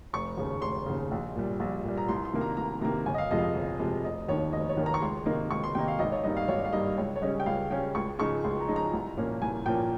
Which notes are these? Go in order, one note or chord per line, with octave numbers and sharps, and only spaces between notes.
F1 C#6
D#2 C#3
F1 C6
D#2 C#3
A#1
A#2 G3
A#1
A#2 G3
A#5
C2 C6
C6
C3 D#3 A#3
A#5
C2 A#5
C3 D#3 A#3 A#5
G1 G#5
D#5
F5
F2 C3 F3 G#3 D#5
F5
D#5
G1
F2 C3 F3 G#3
F1 D#5
D#2 D#3 A#3 C#5
F1 D#5
C#5
D#2 D#3 A#3
A#5
C#6
C#2 C6
C3 D#3 A#3 D#4
C#2 C#6
C6
C3 D#3 A#3 D#4 G5
F5
G#1 D#5
C#5
G2 G3 A#3 D#4 D#5
F5
G#1 C#5
F5
G2 G3 A#3 D#4 D#5
C#2 C#5
C#5
C#3 G3 C#4 D#5
G5
C#2 F5
C#3 G3 C#4 G5
C#2 C#6
C#3 F3 G#3 D#4 C#6
C#2 C6
A#5
C#3 F3 G#3 D#4
A#5
C2
A#2 F3 A#3 C#4
C2 G#5
A#2 F3 A#3 C#4 G5